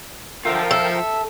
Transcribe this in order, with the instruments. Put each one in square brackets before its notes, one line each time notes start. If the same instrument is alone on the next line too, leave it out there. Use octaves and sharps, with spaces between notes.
[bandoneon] D3 E5 [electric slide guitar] F3 F4 [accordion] A#4 G5
[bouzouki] A4 [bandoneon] E5